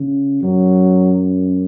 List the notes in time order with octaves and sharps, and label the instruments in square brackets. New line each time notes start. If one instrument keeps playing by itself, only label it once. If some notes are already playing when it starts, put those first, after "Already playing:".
Already playing: [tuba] C#3
[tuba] F#2 [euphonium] F#3